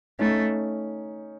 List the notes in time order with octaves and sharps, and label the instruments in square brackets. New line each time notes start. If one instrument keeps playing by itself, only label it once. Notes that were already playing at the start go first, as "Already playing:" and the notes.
[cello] A3 [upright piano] C#4 D#4